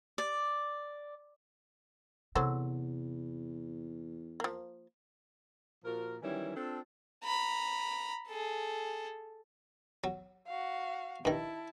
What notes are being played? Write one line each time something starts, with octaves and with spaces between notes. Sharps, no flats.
D5
E2 C3 F#3 A4 C5
F3 A#3
A#2 F3 F#4 A#4
D#3 E3 F#3 G3 C#4 E4
C4 D4 F4 A4
A#5 B5
G#4 A4
F#3
F#4 F5
G2 D#3 E4 A5